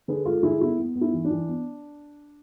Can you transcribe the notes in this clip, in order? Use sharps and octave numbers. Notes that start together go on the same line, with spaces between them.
D3 G#4 B4
G#3 F4 A4
D3 E4 G#4
B3 E4
B3
B3
E4
E3
D4
E3
B3